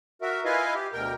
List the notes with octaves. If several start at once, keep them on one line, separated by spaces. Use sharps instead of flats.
F#4 A#4 E5
E4 F4 B4 D#5 F5 G#5
G4
D2 B2 A#4 G5